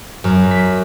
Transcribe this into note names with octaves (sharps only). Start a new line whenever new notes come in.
F#2
B6